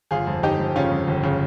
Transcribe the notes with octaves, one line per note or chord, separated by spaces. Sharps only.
G1 F4 G#4
F2
G1 D#4 G4
F2
C#3 C#4 F4
F2
G1
C#3